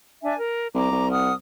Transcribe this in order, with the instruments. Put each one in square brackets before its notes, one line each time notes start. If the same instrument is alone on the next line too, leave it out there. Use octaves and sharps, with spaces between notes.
[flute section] D4 E5 G#5
A#4
[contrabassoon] C2 [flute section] A#5 D6
[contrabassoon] C2
[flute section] F#5 D#6 F6